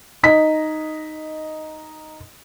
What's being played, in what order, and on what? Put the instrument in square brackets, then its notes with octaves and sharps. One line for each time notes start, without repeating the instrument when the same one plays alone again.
[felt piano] D#4 D#5 B6